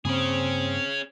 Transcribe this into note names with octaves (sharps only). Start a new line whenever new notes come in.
G2 C#3 A#3 C4 C#4 G#4